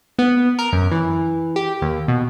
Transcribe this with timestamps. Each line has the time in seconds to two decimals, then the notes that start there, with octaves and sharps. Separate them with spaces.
0.19 B3
0.59 A#4
0.73 F#2
0.92 E3
1.56 G4
1.82 D#2
2.08 B2